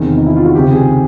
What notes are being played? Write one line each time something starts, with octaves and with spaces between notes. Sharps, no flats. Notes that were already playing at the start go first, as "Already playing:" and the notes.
Already playing: E2 C3 D#3 G#4
D#4
E4
F4
F#4
C#2 C3 D#3 G4
G#4